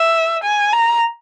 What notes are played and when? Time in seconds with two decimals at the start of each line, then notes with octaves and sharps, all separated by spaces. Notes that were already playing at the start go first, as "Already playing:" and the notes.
Already playing: E5
0.44 G#5
0.72 A#5